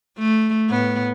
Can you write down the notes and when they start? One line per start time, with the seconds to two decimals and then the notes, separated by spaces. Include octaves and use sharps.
0.18 A3
0.69 A2 B3